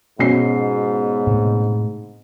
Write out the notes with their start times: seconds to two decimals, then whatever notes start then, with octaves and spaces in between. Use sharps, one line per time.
0.19 G#2 B2 C#4 C7
1.27 A2 C3